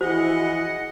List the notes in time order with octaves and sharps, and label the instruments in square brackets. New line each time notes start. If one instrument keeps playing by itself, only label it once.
[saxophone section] E3 F3 G#4 [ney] E4 [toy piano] F#4 C5 [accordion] D#5 F#5